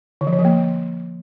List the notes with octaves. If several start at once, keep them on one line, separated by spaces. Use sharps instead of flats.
D3
F3
D3
F3
A#3